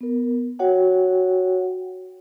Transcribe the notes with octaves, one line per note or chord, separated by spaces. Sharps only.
B3 A#4
F#4 C#5 F#5 G5